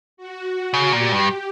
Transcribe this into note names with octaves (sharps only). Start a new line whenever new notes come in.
F#4
F#4
C#3
A#2 G4
G2